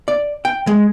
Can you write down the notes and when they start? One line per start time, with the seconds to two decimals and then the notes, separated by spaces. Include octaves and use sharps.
0.08 D5
0.45 G5
0.67 G#3